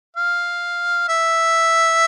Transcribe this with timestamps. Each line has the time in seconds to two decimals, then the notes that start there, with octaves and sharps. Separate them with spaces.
0.17 F5
1.09 E5